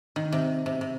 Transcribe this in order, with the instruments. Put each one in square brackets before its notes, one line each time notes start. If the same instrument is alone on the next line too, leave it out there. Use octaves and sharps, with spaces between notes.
[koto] D#3
C3
C3
C3